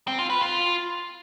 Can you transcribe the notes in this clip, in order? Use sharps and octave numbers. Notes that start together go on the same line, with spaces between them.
C4
F4
B4
F4